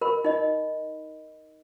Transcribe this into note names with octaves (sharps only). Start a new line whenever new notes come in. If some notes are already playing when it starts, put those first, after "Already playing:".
A#4 B5
D#4 D#5